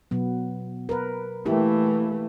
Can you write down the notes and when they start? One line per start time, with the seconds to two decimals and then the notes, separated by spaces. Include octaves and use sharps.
0.11 B2 F#3 B3
0.89 A#4 B4
1.46 E3 A3 A#3 E4 G4